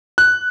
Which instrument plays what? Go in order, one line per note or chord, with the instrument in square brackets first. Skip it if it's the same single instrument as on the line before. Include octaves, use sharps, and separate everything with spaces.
[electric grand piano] F#6